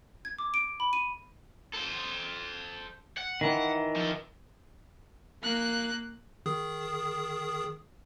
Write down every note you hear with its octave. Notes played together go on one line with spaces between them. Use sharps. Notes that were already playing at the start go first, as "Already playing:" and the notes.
G#6
D6
D7
B5
D#7
A4 C5
F#5
D#3 E3
F3 A4
A#3 F#6
D#3 G#4 D#6